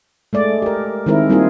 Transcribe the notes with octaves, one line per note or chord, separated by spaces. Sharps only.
G#3 A3 D5
G4 A#4
D#3 G#3 C4 E4 A#4
G3 A#3 C4 D#4 F4 G#4